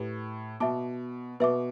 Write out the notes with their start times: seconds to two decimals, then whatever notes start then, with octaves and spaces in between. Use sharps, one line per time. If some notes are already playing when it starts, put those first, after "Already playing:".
Already playing: A2 G4 B4
0.60 B2 E5 A5 D6
1.40 B2 B4 E5 A5 D6